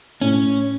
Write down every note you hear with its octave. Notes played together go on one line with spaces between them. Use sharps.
A2 C#4